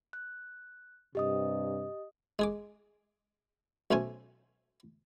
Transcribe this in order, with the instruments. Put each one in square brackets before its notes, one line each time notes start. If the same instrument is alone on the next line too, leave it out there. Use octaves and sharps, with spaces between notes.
[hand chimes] F#6
[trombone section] G2 C3 [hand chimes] G4 D#5 D#6
[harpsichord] G#3 G#4 D6
B1 A3 C#4 C5 G#5